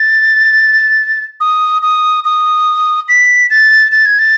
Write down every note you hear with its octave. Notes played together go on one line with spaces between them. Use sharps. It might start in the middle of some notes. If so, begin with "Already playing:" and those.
Already playing: A6
D#6
D#6
D#6
B6
A6
A6
G#6
A6